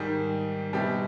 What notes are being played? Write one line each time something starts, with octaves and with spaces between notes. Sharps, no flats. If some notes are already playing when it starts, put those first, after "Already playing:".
Already playing: G#2 D#3 G3
B2 G3 C4 E4 G4